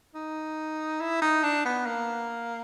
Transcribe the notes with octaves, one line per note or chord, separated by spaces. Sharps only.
D#4
E4
D#4
D4
B3
A#3